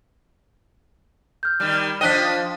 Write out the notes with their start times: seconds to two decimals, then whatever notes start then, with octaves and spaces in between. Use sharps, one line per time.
1.43 F6 G6
1.60 D#3 G3
2.01 F3 D4 D#5 G5 F#6 B6